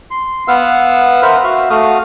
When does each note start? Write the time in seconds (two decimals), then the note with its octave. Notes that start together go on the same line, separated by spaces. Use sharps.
0.11 C6
0.48 B3 B4 F5 F#5 E6
1.22 A#4 C5 E5 F#5 B5
1.44 F#4 E5 F5
1.70 A3 F#4 F5 D#6